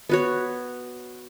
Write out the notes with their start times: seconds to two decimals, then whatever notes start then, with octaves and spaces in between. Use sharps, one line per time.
0.09 B3 F#4 C#5